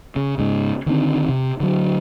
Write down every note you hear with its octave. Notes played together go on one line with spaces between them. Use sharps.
C#3
G#2 C#3
D3 D#3 B3 C4
C3
D3 F#3